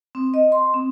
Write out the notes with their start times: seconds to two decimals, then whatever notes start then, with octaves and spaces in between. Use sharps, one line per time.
0.15 C4
0.34 D#5
0.52 C6
0.74 C4